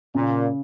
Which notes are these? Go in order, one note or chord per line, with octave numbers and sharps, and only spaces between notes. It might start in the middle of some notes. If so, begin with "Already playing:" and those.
A#2 C#3